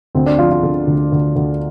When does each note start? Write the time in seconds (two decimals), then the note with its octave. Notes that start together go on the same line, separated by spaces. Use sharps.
0.15 D2 C4
0.26 D4
0.39 F3 F4
0.51 F4
0.63 D3
0.87 D2
1.12 D2
1.36 D2